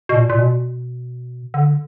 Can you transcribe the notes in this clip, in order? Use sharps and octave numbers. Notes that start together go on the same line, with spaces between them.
B2
A#2
A#2
B2
D3